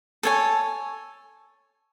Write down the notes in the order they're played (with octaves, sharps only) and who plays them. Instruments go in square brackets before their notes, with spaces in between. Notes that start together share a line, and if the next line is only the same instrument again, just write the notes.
[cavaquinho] A4 C#5 G#5